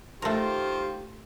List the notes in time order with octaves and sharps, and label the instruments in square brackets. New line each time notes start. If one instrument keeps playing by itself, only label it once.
[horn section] D#3 F4 C5 [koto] A3 A#4 [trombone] G4